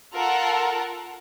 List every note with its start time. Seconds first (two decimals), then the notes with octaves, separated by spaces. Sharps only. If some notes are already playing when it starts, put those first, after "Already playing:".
0.13 F4 A4 A#4 F#5